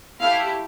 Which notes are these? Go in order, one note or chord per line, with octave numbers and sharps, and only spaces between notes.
A3 E4 G4 F5